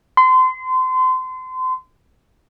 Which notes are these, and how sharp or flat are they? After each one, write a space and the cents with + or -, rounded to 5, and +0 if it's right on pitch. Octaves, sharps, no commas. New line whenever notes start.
C6 -30